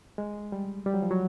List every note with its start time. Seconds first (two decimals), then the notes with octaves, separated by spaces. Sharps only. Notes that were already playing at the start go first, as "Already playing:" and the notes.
0.18 G#3
0.52 G3
0.86 G3
0.94 F#3
1.02 F3
1.11 F#3